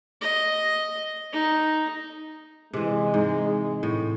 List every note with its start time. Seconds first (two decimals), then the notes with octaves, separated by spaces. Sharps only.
0.21 D#5
1.33 D#4
2.73 C3 E3 G#3
3.14 G#2
3.83 A2